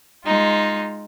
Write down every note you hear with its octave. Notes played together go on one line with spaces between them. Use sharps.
G#3 D#4 F4